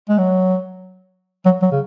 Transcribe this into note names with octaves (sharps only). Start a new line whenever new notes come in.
G#3
F#3
F#3
F#3
C#3